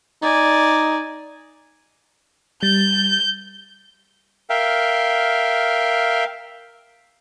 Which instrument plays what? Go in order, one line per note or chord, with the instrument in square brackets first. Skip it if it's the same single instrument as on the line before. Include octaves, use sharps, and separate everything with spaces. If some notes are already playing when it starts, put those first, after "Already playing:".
[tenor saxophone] D#4 [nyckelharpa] D5 G#5
[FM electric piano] G3 A6 [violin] G6
[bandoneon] A#4 E5 F5 G5